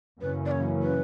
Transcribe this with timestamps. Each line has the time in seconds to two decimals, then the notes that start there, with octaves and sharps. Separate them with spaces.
0.21 F#2 C#3 E3 A#3 C#4 B4
0.46 D5
0.51 C#5
0.83 B4